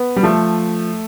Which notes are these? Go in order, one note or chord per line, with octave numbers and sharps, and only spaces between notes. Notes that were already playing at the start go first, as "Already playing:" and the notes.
Already playing: B3
G3
F3 A3